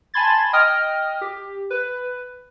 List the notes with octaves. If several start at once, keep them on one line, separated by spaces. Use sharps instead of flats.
G#5 A5 B5 C6 G#6 A6
D#5 G5 D#6 F6
G4
B4